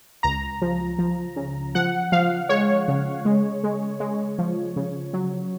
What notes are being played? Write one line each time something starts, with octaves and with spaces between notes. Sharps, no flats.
C#2 A#5
F3
F3
C#3
F3 F#5
F3 F5
G#3 C#5
C#3
G#3
G#3
G#3
F3
C#3
F#3